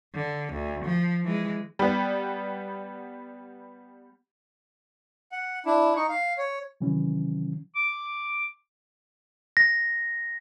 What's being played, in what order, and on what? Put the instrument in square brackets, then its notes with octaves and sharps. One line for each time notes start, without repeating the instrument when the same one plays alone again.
[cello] D3
D2
F3
E3 G#3
[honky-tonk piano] G3 B3
[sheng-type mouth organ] F#5
D4 E4
D#4 C#6
F5
C#5
[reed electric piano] C3 D#3 E3 F#3 C#4
[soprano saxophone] D6
[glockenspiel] A#6